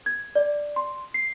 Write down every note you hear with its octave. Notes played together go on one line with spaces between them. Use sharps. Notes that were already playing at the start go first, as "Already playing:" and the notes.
G#6
D5
C6
C7